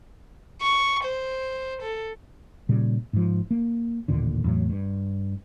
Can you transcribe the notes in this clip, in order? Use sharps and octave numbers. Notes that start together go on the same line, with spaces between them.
C#6
C5
A4
A#2 C#3 G3
G#2 F3
A#3
A1 D#2 A#2 D3
E2 A2 F#3
G2